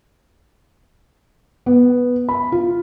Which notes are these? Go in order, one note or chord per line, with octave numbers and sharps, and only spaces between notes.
B3
B5
F4